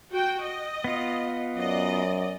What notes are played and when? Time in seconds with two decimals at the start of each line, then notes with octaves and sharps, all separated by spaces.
0.13 F#4 G5
0.43 D#5
0.84 B3 F4
1.56 F#2 D5 D#5